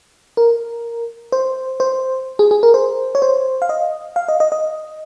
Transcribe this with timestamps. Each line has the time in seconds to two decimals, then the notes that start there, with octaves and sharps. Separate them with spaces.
0.37 A#4
1.32 C5
1.80 C5
2.39 G#4
2.51 G#4
2.63 A#4
2.74 C5
3.15 C#5
3.22 C5
3.62 F5
3.69 D#5
4.16 F5
4.28 D#5
4.40 D#5
4.52 D#5